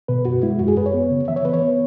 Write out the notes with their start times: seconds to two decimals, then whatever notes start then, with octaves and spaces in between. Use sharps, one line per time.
0.08 B2 B4
0.25 F#2 F#4
0.43 G#3 E4
0.59 F#2 F#4
0.68 G#4
0.77 F#2 B4
0.86 C#5
0.94 B3
1.11 C#3
1.28 E3 E5
1.36 C#5
1.45 B3 B4
1.53 C#5
1.62 B3